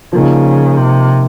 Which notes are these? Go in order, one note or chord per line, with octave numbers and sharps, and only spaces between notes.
C#3 F3 A#3 D#4
C3